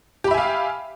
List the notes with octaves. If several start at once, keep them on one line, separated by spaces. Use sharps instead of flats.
G4 E5 F5 G#5 B5